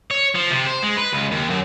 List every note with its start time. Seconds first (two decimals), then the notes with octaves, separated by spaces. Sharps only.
0.11 C#5
0.35 F3
0.51 C3
0.67 C5
0.83 G#3
0.97 B4
1.13 C#2
1.31 D#2
1.50 F#2